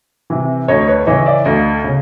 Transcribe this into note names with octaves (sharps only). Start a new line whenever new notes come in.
C3 E3
D2 C#5 D#5
B4 C#5
C#3 E3 C#5 D#5
D5 E5
D2 D#5 F5
C#3